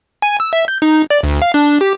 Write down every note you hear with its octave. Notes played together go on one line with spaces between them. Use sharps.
G#5
E6
E5
G6
D#4
D5
D2
F5
D4
G4